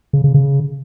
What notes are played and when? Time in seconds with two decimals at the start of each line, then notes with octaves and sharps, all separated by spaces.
0.13 C#3
0.24 C#3
0.34 C#3